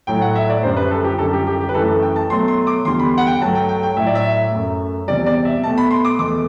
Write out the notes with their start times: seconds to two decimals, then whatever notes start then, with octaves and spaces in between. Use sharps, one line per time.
0.07 A2 F#3 A3 G5
0.22 F#5
0.36 E5
0.49 D5
0.63 F#2 D3 G3 C5
0.76 B4
0.91 A4
1.04 G4
1.18 F#2 D3 G3 A4
1.33 G4
1.47 G4
1.60 G4
1.69 B4
1.74 F#2 E3 A3 A4
1.88 A4
2.02 G5
2.16 A5
2.30 B2 F#3 A3 C6
2.48 C6
2.67 D6
2.85 E2 D3 G3 C6
2.99 B5
3.18 F#5
3.27 G5
3.41 G2 F#3 A3 A5
3.55 G5
3.69 G5
3.83 G5
3.97 A2 F#3 A3 E5
4.07 D5
4.15 E5
4.52 F#2 F#3 A3
5.08 E2 C3 G3 D5
5.26 D5
5.45 E5
5.63 B2 A5
5.67 A3
5.78 B5
5.91 C6
6.05 D6
6.19 E2 B2 A3 D6